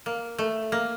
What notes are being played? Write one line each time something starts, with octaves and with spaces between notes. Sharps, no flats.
A#3
A3
A#3